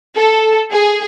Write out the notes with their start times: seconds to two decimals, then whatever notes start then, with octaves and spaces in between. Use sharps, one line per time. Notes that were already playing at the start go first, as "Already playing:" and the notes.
0.18 A4
0.72 G#4